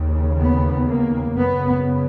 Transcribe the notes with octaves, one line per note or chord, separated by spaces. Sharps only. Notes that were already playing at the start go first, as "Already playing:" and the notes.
Already playing: D#2 C#3
B3
A#3
F#2 C#3 B3